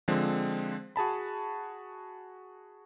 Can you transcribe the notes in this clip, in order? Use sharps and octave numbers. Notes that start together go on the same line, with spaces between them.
D3 F3 G#3 C4
F#4 G#4 A5 B5